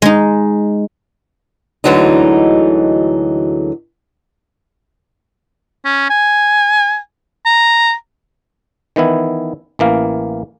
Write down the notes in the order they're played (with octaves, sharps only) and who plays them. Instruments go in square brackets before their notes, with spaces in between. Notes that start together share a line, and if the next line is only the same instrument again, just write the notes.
[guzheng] G#3 D#4
[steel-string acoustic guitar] D2 D3 E3 F#3 G#3 D#4
[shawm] C#4
G#5
A#5
[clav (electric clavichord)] D#3 E3 B3 E4
A1 E3 A#3 F5